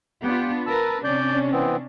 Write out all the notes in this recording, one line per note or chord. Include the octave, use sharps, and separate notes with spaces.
B3 D4 F4 G4 F#5 G5
A#4 B4 A5 E6
C3 C#4 D4 D5 G6
E3 B3 C4